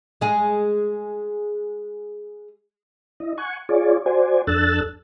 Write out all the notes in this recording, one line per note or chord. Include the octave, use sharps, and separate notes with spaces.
G#3 G#4
E4 D#5
F#5 G#5 C#6
F4 G#4 C#5 D5
F#4 C5 D5 G#5
F2 D4 A4 E6 F#6 A6